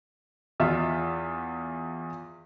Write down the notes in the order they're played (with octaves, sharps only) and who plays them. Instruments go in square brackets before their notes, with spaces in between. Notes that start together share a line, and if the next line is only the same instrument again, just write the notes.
[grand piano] E2 F4 E5